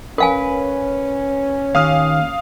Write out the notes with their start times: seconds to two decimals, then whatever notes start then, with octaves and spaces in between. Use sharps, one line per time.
0.18 C#4 A#4 B4 F5 G#5
1.75 D#2 F5 D#6 F6